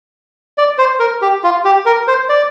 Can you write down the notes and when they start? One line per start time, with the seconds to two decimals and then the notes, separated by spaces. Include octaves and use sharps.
0.58 D5
0.78 C5
1.00 A#4
1.22 G4
1.44 F4
1.65 G4
1.86 A#4
2.08 C5
2.29 D5